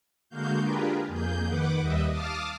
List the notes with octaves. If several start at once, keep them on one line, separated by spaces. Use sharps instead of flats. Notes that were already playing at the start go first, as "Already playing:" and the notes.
D3 G#3 A#3 F#4 F5 G6
D4 F4 G4 G#4 A#4 B4
F2 A#3 G#4 G6
D#3 B4 F#5 D6
D#2 G3 D#5 E5 D#6
F5 A5 D6 D#6 F6